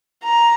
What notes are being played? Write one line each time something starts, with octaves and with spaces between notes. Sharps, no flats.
A#5